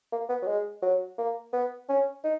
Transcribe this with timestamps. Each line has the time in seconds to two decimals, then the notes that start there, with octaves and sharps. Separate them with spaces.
0.12 A#3
0.29 B3
0.42 F#3
0.47 G#3
0.82 F#3
1.18 A#3
1.53 B3
1.89 C#4
2.24 D#4